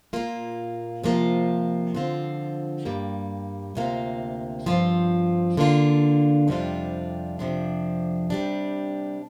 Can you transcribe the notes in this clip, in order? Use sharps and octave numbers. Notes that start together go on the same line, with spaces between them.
A#2 A#3 F4
C3 F3 A#3 F4
D3 F3 C4 F4
G2 G3 A#3
D2 C3 A#3 F4
G2 F3 C4 F4
D3 A#3 D4 F4
F2 C3 G3 D4 F4
F2 C3 F3 D4
C3 G3 D4